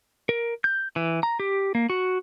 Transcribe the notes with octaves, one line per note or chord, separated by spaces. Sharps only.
A#4
G6
E3
A#5
G4
A#3
F#4